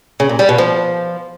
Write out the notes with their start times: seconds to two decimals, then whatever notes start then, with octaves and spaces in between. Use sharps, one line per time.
0.20 C#3
0.29 A#2
0.39 G3
0.49 B2
0.58 F3